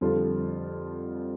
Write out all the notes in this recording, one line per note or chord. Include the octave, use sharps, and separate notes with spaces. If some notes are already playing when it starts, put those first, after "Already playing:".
F2 D3 G3 F4 A4